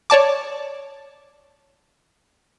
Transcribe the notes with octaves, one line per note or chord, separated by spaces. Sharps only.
C#5 D5 A5 D6